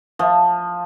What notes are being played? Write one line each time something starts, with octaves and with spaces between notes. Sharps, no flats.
F3